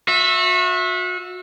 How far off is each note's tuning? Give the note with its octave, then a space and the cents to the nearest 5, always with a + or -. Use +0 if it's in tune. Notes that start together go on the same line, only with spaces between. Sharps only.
F#4 -35 E5 +0